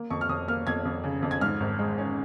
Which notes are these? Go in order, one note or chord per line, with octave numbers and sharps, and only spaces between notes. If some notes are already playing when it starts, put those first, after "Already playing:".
Already playing: A#3
F2 C#6
F6
F2 D#6
A#3 F6
F2 G#6
F2
C#3
F2
G#6
G#2 F6
G#1
G#3
C#4